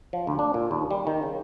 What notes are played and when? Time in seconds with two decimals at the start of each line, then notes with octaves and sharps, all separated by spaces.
0.13 F3
0.27 D2
0.39 D4
0.54 A#2
0.71 D#2
0.91 G3
1.07 D#3
1.23 C#3